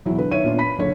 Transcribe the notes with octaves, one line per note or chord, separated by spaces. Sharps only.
E1 F#3 E4
D3 B4
D#3 C#5 E5 D#7
A#2 B3 D4 F4
B5 B6
F#1 D3 C#5